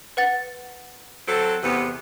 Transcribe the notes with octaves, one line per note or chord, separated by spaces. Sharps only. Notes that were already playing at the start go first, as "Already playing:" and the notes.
B4 F#5 A6
F#3 C4 A4
E2 C3 B3